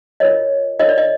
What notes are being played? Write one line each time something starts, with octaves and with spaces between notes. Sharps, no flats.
F4 A#4 C#5 D#5
F4 A#4 C#5 D#5
D5
D#5